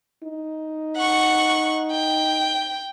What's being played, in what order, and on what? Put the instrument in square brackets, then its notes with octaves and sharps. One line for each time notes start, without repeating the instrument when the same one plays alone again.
[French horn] D#4
[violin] F#5 C#6
G5